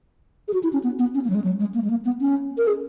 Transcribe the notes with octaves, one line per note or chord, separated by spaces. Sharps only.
G#4
F#4
E4
C#4
B3
B3
C#4
A#3
F#3
G#3
F#3
G#3
A#3
G#3
A#3
B3
C#4
A#4
G#4